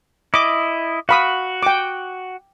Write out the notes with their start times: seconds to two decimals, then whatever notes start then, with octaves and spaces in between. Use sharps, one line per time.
0.34 E4 D#5 D6
1.09 F#4 F5 B5 D#6
1.63 G5 D6